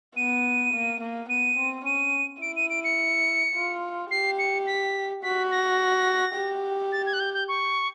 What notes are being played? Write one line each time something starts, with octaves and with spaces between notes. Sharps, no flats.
B3 D#7
A#3
A#3
B3 D#7
C4
C#4 D#7
E4 D7
D#7
D7
C#7
F4
G4 C7
C#7
B6
F#4 B6
A#6
G4
A6
G#6
F#6
G6
G6
C#6